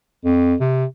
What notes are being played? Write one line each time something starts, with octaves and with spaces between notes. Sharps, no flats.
F2
C3